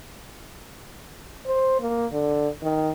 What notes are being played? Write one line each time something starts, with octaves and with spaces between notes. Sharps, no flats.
C5
A#3
D3
D#3